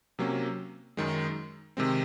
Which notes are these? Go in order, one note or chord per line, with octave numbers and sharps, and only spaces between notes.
C3 F#3 A#3 C#4
F#2 D#3 G#3
C3 D#3 G#3 C4